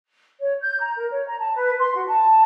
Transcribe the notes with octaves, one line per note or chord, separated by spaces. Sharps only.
C#5
G6
A#5
A#4
C#5
A#5
A5
B4
C6
F#4
A5